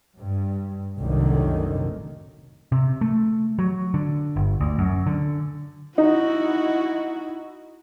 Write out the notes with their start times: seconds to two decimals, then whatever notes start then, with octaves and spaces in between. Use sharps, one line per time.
0.20 G2
0.99 F1 C2 F#2 A2 D3 D#3
2.72 C3
3.01 A3
3.59 F#3
3.94 D3
4.36 G1
4.60 D2
4.79 F#2
5.07 D3
5.98 D#4 E4 F#4